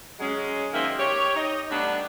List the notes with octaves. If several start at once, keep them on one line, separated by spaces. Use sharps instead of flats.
F#3 G#3 C#4
F#2 D#3 A#3 C5 D#5 E5
G4 C#5
D#4 D#5
G3 A3 B3 D4